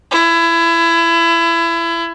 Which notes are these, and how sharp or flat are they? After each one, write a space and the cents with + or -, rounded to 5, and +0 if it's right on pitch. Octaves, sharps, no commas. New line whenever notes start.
E4 +25